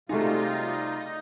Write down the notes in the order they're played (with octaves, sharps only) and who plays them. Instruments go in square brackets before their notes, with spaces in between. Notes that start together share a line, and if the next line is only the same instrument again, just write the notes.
[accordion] C3 G3 F4 [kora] A3 F#4 G#4 [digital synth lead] D#4